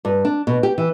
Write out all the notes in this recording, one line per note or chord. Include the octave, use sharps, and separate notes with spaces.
G2
D4
B2
G4
E3